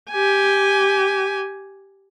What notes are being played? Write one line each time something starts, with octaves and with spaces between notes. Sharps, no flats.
G4 G#5